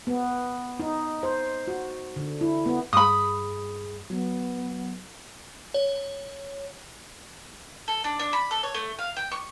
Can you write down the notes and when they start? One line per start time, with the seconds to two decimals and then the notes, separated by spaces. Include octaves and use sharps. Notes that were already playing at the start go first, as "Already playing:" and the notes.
0.07 B3
0.80 D#4
1.23 C5
1.68 F#4
2.16 D3
2.41 E4
2.66 B3
2.93 G2 G#4 B5 D#6
4.10 F#3 B3
5.74 C#5
7.88 A4
8.04 D4
8.20 D4
8.33 B5
8.51 A4
8.63 C#5
8.74 A3
8.99 F5
9.17 G5
9.32 C#6